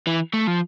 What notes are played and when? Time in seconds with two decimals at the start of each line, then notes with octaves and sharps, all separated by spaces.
0.07 E3
0.34 A3
0.47 F3